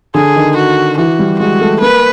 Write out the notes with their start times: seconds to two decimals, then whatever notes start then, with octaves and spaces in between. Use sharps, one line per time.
0.14 D3 G#4
0.36 D#3
0.57 F#4
0.98 E3 F#4
1.19 G3
1.40 G#3 F#4
1.61 A3
1.81 A#3 B4